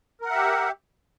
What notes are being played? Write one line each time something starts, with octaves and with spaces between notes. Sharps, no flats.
G4 A#4 E5 F#5